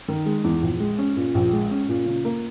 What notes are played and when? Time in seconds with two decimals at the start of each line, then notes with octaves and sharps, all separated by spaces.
0.08 D#3
0.26 G#3
0.44 E2
0.62 A#1
0.80 G#3
0.98 C#4
1.16 A#2
1.35 A#1
1.53 G#3
1.71 C#4
1.88 A#2
2.06 C#3
2.25 A#3